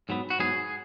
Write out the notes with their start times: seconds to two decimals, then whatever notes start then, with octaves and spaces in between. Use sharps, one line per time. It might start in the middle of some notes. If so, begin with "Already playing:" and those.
0.09 G#2 F#3 B3
0.30 F#4
0.39 G#2 F#3 B3 G#4